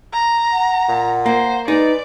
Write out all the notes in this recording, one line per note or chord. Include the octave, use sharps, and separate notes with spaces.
A#5
F#5
A#2
A#3 C5
G#3 D#4 B4 D5